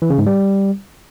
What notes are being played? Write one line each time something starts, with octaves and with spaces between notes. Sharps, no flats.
E3
C#3
G#2
G3